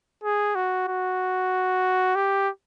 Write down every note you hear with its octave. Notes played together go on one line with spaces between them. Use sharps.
G#4
F#4
F#4
G4